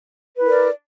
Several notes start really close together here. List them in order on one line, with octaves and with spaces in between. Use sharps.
B4 E4 A#4 D5